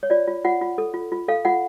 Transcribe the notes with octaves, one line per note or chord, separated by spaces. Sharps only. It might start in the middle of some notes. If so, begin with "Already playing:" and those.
C#5
F4 D5
F4
F4 F#5
F4
A4
F4
F4
A4 F5
F4 F#5